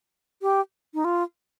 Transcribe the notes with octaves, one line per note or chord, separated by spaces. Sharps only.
G4
D#4
F4